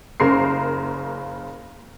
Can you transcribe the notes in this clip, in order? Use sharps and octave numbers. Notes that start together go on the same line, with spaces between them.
F#1 C#3 A#4 C6 C7